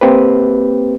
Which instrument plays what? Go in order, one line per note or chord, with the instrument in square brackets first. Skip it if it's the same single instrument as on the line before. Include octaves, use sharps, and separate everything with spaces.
[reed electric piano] A#3 C4 G4 B4